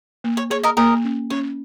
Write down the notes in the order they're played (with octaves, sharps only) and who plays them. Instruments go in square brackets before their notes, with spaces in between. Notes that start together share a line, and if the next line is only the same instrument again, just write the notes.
[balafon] A#3
[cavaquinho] C#5
[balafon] G#4 [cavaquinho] C#5
[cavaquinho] A#4 D#5
[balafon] A#3 [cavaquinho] A#4 D#5
[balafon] C#4
[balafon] C#4 [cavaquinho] C#5